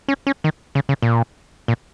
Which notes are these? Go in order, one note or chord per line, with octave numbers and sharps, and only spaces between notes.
C#4
C#4
D#3
C#3
C#3
A#2
A#2